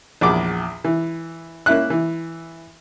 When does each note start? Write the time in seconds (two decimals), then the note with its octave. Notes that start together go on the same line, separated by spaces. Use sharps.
0.21 A#1 E2 F#5 D6
0.85 E3
1.66 A#3 C#4 E4 E5 F#6
1.90 E3